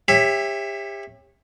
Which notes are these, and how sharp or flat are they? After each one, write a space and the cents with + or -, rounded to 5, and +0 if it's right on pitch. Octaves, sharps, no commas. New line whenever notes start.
G4 +30 C#5 -20 E5 +0